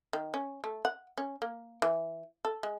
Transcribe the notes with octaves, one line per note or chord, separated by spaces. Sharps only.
D#3
C#4
A3
F#5
C#4
A#3
E3
A4
G#3